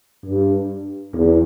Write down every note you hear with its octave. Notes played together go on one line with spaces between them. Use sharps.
G2
E2